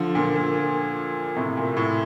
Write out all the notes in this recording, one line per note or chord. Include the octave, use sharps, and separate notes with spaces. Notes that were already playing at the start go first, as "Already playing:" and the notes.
Already playing: D3 F3
A#2 D3
A#2
A2 C3
A#2
A2